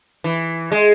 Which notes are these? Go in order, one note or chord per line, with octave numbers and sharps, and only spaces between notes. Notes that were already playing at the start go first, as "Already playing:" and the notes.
E3
G#3